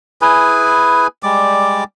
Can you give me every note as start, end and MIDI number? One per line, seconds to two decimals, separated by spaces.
0.22 1.07 64
0.22 1.07 68
0.22 1.07 71
0.22 1.07 80
1.23 1.84 55
1.23 1.84 56
1.23 1.84 74
1.23 1.84 86